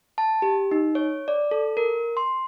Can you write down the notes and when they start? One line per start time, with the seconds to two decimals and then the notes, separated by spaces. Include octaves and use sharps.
0.18 A5
0.42 G4
0.71 D#4
0.95 C#5
1.28 D5
1.51 A4
1.77 A#4
2.17 C6